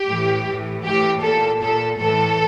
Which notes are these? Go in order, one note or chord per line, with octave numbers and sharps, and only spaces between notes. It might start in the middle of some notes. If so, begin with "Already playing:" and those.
Already playing: G4
A2 E3
A2 E3
A2 E3 G4
A#2 A4
A#2 A4
A2 E3 A4